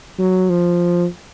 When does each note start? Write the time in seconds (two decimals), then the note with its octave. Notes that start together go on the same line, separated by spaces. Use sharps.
0.19 F#3
0.50 F3